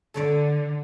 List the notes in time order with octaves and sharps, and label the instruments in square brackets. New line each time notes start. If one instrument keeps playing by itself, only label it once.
[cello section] D3 [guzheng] A4 C#5 D5